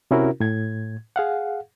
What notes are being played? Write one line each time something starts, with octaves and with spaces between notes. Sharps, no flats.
C3 C#4 E4 F#4 A#4
A2 G#6
G#4 F5 F#5